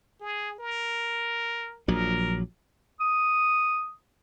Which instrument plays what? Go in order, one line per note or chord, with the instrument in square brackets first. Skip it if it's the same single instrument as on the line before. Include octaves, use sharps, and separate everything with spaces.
[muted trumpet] G#4
A#4
[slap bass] A#1 F#3 [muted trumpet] A#4
[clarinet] D#6